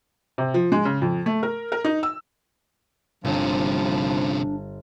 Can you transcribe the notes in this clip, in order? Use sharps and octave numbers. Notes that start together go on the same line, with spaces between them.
C3
F3
G#3
C#3
F2
A3
A#4
A#4
D#4
E6
G1 D#2 C3 F3 C#4 D4